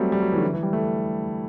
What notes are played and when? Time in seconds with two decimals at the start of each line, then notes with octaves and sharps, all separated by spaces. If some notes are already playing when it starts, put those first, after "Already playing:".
Already playing: F#3 G3 A3 C4
0.12 G3
0.22 F#3
0.32 E3
0.38 D3
0.43 E3
0.53 E3
0.63 G3
0.73 A3